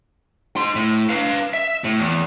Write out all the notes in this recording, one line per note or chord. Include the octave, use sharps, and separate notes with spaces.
D#4 C6
A2
B4 F5
E5
A2
E2